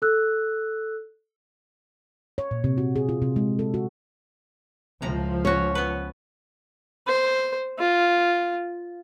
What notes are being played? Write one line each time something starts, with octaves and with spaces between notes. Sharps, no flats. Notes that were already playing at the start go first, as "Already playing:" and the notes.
A4 E6 F#6
C#5
A#2
C3
F#4
G#4
F4
C3
G#3
A4
F#4
C#2 A2 F3 A#5
C#4 F#4 C#5
B3 B4
C5
F4